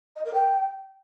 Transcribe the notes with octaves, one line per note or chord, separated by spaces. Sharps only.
D#5
A#4
G5